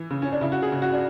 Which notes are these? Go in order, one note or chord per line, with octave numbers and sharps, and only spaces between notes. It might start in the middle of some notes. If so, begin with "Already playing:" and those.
Already playing: E3
C#3
C#4
D4
C#3 E4
F#4
G#4
C#3
F#4
D4